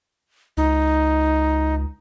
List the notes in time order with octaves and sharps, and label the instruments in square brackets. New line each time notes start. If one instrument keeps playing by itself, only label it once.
[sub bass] C#2 [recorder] D#4